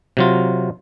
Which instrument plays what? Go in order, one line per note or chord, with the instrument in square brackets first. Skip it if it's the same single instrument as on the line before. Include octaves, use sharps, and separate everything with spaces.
[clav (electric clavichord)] C3 F#3 F4